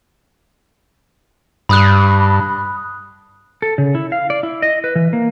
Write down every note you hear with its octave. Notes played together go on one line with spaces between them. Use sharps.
G2 B5 D#6 F#6
A4
C#3
E4
F5
D5
E4
D#5
B4
E3
A#3